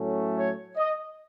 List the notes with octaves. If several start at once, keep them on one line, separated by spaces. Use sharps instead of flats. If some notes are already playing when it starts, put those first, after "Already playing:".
Already playing: A2 F#3 A3 C#4
C#5
D#5